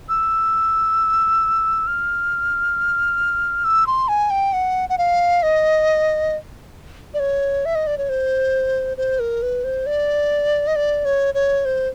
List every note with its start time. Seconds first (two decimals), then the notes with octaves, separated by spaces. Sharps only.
0.09 E6
1.87 F6
3.64 E6
3.87 C6
4.08 G#5
4.30 G5
4.53 F#5
4.89 F#5
4.98 F5
5.43 D#5
7.14 D5
7.20 C#5
7.65 E5
7.75 D#5
7.87 D5
7.98 C#5
8.09 C5
8.97 C5
9.19 A#4
9.42 B4
9.64 C5
9.86 D5
10.67 D#5
10.76 D5
11.05 C#5
11.34 C#5
11.65 C5